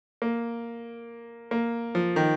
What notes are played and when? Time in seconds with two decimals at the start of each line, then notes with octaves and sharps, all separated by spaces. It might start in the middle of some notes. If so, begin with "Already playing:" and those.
0.22 A#3
1.51 A#3
1.95 F3
2.16 D#3